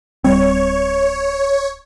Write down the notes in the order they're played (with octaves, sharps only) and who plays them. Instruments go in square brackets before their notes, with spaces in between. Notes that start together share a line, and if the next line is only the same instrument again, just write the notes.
[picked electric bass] D1 G3 C4 [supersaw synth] C#5